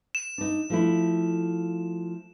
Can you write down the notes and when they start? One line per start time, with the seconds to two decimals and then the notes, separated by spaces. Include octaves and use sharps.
0.15 E7
0.38 D4 D#4
0.70 F3 A3 E4